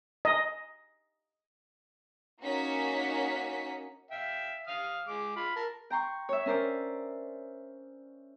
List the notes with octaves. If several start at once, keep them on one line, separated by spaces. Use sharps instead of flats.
D#5
A#3 C#4 D#4 F#4 B6 C#7
E5 F5 G5
F5 D#6 F6
G#3 D6
F4 B5
A#4 A5
G5 A#5 C6 C#6
C#5 E5
C#4 A#4 C5 D5